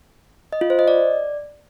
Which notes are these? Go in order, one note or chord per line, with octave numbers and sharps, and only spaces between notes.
D#5
F4
C5
D#5
D5